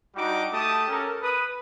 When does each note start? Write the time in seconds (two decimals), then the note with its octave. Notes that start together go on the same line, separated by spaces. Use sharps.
0.16 G3 D4 D#4 F#4 D6
0.53 A3 G4 A5 D#6
0.88 C#4 A4 A#4
1.22 B4 D#6